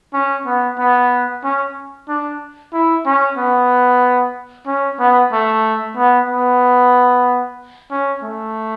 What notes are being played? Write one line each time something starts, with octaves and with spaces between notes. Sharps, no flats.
C#4
B3
B3
C#4
D4
E4
C#4
B3
C#4
B3
A3
B3
B3
C#4
A3